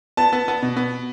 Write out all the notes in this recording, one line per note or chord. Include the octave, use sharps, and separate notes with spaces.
B3 A5
B3
B3
B2
B3